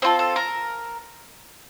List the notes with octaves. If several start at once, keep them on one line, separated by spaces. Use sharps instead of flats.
C4 F4 A4 C5
A4
A#4